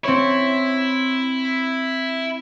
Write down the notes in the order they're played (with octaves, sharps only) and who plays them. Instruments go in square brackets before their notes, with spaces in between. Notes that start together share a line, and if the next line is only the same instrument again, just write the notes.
[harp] C4 C#5 [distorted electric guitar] E4